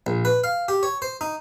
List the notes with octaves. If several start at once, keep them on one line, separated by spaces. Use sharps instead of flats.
A#1
B4
F5
G4
C#5
C5
D#4